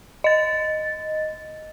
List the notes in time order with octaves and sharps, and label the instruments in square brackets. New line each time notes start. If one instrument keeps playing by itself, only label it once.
[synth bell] D#5 A6